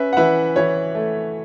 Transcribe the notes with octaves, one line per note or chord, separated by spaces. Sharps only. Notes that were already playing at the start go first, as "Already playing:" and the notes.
Already playing: C#4 B4 E5
F#5
E3 B4 E5
E3 C#5
A3